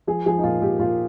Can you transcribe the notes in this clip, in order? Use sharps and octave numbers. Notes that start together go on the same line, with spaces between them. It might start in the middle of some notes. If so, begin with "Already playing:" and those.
F3 G#4
F3 G#4
D#4
A#2 F4
A#2 G4
A#2 F4